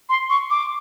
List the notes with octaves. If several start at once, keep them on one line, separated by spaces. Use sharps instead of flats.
C6
C#6
D6